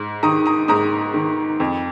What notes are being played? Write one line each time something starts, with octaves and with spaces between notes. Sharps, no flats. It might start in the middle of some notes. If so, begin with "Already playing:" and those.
Already playing: G#2
D#3 A#5 D#6
A#5 D#6
G#2 A#5 D#6
D#3
F2